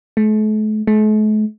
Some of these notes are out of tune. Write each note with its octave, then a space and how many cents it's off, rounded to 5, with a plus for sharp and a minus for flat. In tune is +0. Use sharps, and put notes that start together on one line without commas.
A3 -40
A3 -45